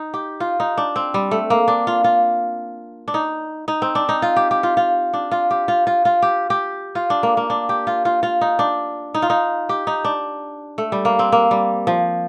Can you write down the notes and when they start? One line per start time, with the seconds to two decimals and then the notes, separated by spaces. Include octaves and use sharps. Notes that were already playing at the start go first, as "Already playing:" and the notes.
Already playing: D#4
0.14 G4
0.40 F4
0.60 D#4
0.77 D4
0.96 C4
1.14 G3
1.31 A3
1.50 A#3
1.68 D4
1.87 F4
2.04 F4
3.08 D4
3.14 D#4
3.68 D#4
3.82 C4
3.95 D4
4.09 D#4
4.22 F4
4.36 G4
4.51 G4
4.63 F4
4.77 F4
5.13 D4
5.31 F4
5.51 G4
5.68 F4
5.87 F4
6.05 F4
6.22 G4
6.50 G4
6.95 F4
7.10 D4
7.23 A#3
7.37 A#3
7.50 D4
7.69 G4
7.87 F4
8.05 F4
8.23 F4
8.41 D#4
8.59 D4
9.14 D#4
9.22 F4
9.30 D#4
9.69 G4
9.87 D#4
10.05 D4
10.78 A3
10.92 G3
11.05 A#3
11.19 C4
11.32 A#3
11.51 G3
11.87 F3